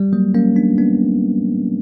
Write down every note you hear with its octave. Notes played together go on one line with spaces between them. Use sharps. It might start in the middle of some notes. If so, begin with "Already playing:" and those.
Already playing: G3
F#3 A#3
A#3 C#4
B3 D4
B3 D4